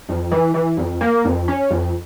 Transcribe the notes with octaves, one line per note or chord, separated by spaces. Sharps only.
F2
E3
E3
F2
A#3
F2
C#4
F2